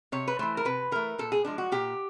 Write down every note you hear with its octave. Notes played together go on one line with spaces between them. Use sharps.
C3 C#5
B4
E3 A3 C5
A#4
C3 B4
E3 A3 A#4
A#2 A4
G#4
F3 G#3 D4
F#4
A#2 G4